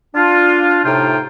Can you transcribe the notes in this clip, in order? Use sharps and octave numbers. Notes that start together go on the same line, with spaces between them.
D4 F4
A2 C3 D#4 F4 C5 G5